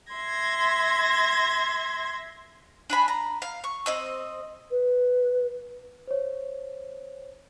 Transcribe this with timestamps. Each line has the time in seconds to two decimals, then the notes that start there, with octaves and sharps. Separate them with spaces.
0.12 E5 C6 G#6 A#6
2.90 D4 G#5 B5
3.08 A#5
3.42 F5
3.64 C#6
3.86 C4 D#5 E6
4.71 B4
6.07 C5 C#5